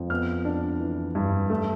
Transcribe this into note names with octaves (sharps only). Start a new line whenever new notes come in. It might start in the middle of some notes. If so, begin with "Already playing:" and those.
Already playing: F2
B3 F6
D4
E3
G2
A3